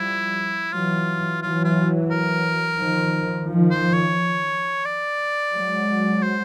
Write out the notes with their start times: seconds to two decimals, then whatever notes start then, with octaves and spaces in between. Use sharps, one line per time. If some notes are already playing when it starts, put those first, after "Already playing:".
Already playing: F3 G3 E4
0.73 E3 F#3 F4
1.42 E3 F#3 F4
1.64 F4
2.11 A#4
2.79 D#3 F3
3.48 D#3 F3
3.71 C5
3.94 C#5
4.85 D5
5.54 F#3 G#3
6.22 C5